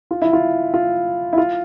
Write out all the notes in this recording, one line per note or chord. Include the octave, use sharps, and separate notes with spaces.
F4
E4
F4
F4
E4
F4